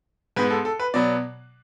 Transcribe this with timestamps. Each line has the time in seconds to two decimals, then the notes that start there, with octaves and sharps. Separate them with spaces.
0.36 G#2 G#3 B3 B4
0.51 A4
0.65 A4
0.79 B4
0.94 B2 F#3 B3 D5